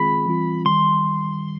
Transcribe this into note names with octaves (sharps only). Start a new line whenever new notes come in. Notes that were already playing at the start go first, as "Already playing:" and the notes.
Already playing: D#3 G#3 C4 F4 G#4 B5
E3 G3 C4 F4
D#3 G3 C6